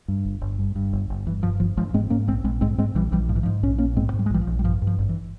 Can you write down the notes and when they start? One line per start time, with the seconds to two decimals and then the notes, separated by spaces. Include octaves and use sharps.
0.08 G2
0.25 G1
0.41 G1
0.59 G2
0.75 G2
0.93 G1
1.10 G1
1.27 G2 E3
1.43 G2 F3
1.60 G1 F3
1.77 G1 F3 G#3
1.94 G#2 G#3 C4
2.10 G#2 A#3 C#4
2.28 A#1 G#3 C4
2.44 A#1 G#3 C4
2.61 G#2 G#3 C4
2.78 G#2 G#3 C4
2.95 A#1 E3 G3
3.12 A#1 E3 G3
3.29 G#2 F3
3.36 E3
3.43 G#2 F3
3.63 A#1 C#4
3.78 A#1 A#3 C#4
3.96 G#2 G#3 C4
4.13 G#2
4.19 G3
4.26 G#3
4.30 A#1 E3 G3
4.41 F3
4.47 A#1
4.59 G3
4.64 G2 F3
4.82 G2
4.87 F3
4.98 G#1
5.09 E3